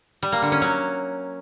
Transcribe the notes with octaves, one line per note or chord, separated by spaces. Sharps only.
G3
A#3
D3
C#4
F#3